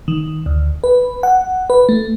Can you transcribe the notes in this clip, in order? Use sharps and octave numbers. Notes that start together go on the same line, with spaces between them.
D#3
D2
B4
F#5
B4
A3